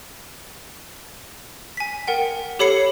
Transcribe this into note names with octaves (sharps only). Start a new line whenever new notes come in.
G#5 B6
A#4 F#5 G5
G4 A4 C#5 B5 C7 C#7